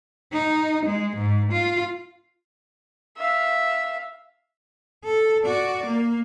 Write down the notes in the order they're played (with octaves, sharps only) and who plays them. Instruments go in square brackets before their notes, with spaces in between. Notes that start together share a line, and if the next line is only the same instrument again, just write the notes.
[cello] D#4
G#3
G#2
F4
[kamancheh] E5 F5
[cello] A4
F#4 D5
A#3